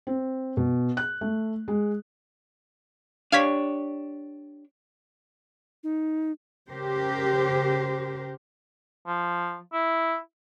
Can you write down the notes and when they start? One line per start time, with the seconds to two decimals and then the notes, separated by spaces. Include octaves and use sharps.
0.07 C4
0.57 B2
0.97 F#6
1.21 A3
1.68 G#3
3.32 D4 G4 C#5 F5 G#6 B6
5.83 D#4
6.70 C#3 G4 A#4 C5
9.07 F3
9.73 E4